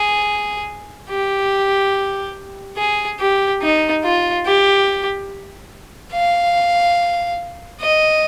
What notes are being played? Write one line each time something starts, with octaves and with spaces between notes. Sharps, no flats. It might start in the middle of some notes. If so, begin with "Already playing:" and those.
Already playing: G#4
G4
G#4
G4
D#4
F4
G4
F5
D#5